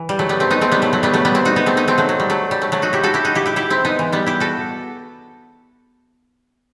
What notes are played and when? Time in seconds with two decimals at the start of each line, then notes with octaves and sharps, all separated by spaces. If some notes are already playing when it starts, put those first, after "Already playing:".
Already playing: E3
0.09 G3
0.19 F#3 A3
0.29 G3 B3
0.40 A3 C4
0.50 B3 D#4
0.61 A3 C4
0.72 G3 B3
0.82 F#3 A3
0.93 F#3 A3
1.03 G3 B3
1.14 F#3 A3
1.25 G3 B3
1.35 C4 E4
1.45 D#4 F#4
1.56 B3 D#4
1.66 A3 C4
1.77 B3 D#4
1.88 A3 C4
1.98 F#3 A3
2.09 F#3
2.20 G3
2.30 F#3 A3
2.51 G3
2.61 F#3 A3
2.72 F#3 A3
2.82 D#4 F#4
2.93 E4 G4
3.03 F#4 A4
3.14 E4 G4
3.25 D#4 F#4
3.35 E4 G4
3.46 E4 G4
3.56 E4 G4
3.70 C4 E4
3.85 B3 D#4
3.99 E3
4.12 G3 B3
4.26 E4 G4
4.40 F#4 A4